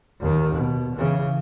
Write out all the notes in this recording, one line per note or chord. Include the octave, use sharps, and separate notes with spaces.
D#2 D#3
B2
C#3 E3